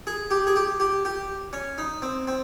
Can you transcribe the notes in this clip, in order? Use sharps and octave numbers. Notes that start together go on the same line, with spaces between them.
G#4
G4
G#4
G4
G4
G4
C#4
D#4
C4
C4